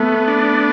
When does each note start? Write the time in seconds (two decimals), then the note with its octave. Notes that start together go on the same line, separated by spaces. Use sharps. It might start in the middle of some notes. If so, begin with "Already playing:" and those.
Already playing: A3 B3
0.28 D4